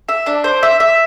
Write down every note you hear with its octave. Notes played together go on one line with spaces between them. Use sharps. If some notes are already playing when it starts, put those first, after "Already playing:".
E5
D4
C5
E5
E5